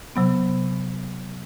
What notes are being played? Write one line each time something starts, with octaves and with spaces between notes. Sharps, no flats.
C3 F#3 B3